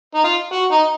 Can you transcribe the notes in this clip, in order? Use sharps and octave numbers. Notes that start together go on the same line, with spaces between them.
D#4
F4
F#4
D#4